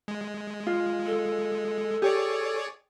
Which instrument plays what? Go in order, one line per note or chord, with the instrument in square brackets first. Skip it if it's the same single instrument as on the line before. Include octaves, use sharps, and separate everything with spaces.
[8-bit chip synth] G#3
[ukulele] F4
[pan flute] A4
[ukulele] G4 [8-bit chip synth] G#4 C#5 D5